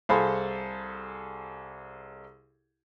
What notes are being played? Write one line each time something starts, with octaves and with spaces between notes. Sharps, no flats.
C2 G#4 A4 C5 F5 B5